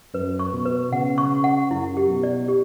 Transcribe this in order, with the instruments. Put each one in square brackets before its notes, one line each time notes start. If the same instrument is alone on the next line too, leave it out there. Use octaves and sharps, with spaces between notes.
[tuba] F#2 [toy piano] B4
[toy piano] C#6
[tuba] B2
[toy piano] B4
[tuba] C#3 [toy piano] F#5
[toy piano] C#6
F#5
[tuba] F#2 [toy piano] E4
[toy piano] G4
[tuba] B2
[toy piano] D5
G4